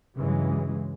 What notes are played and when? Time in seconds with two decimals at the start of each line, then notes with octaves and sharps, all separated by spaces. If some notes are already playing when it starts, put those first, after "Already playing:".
0.15 G2 C#3 E3 F#3 G#3